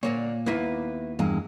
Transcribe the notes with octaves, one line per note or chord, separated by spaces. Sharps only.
A#2 D3 A#3 C#5
D#2 A#3 B3 E4 B4
E2 G2 G#3 A#3